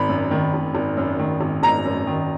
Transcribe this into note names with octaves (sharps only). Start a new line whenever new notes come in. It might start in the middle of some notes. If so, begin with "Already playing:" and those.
Already playing: G#1 B5
F#2
D#3
G#1
G#1
F#2
D#3
G#1
G#1 A#5
F#2
D#3